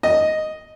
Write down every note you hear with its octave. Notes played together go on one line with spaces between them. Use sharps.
D#5